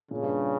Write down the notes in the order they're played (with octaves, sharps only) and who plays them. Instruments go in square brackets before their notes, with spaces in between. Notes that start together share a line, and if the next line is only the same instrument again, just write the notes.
[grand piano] A#2 [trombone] C#3
[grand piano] G2